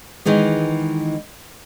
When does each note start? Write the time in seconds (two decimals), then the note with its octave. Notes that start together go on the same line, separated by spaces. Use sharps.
0.26 D#3 E3 G#3 B3